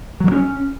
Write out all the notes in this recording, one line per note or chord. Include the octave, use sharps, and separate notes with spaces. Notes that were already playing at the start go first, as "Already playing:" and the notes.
F#3
G#3
C#4